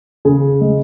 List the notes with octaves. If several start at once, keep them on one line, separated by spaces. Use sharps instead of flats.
C#3 G#4
G#3